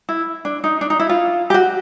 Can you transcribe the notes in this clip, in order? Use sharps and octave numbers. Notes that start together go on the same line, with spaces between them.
E4
D4
D#4
D4
D#4
E4
F4
G4
F#4